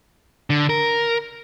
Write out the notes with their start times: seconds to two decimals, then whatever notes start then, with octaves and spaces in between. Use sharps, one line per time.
0.50 D3
0.70 A#4